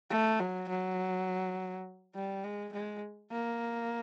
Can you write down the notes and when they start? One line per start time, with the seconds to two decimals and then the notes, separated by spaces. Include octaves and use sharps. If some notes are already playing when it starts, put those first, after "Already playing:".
0.10 A3
0.40 F#3
0.69 F#3
2.14 G3
2.44 G#3
2.73 G#3
3.31 A#3